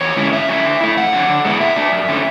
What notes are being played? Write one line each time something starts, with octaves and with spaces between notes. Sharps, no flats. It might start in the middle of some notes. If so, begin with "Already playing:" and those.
E2 C#5
D3 G#3 C#4 E4
G#2 E5
F#3 C#4 E4
D3
A3 E4
E2 F#5
D3 F#3
D3
G#3 B3 E4
B2 E5
A3 D4
F#2
D3 A3 C#4